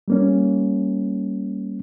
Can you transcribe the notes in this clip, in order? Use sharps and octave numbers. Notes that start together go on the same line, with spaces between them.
G3 A#3 C#4